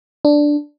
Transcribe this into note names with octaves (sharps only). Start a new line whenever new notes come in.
D4